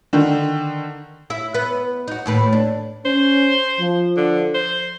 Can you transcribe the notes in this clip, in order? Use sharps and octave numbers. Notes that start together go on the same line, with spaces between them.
D3 D#3
E4 E5
B3 B4
D#4 F#4
D#2 A2 B4
D4
C#4 C5
F3
D3
C5